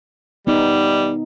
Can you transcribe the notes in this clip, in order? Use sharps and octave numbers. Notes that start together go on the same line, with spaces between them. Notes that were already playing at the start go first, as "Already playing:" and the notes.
G3 B3 D#4